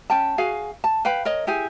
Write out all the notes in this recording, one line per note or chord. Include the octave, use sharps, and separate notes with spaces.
C#4 G5 A5
F#4 G#4 F5 G#5
A5
B4 F5 G5 B5
A#4 C#5 D#5
E4 G4 G#4 G#5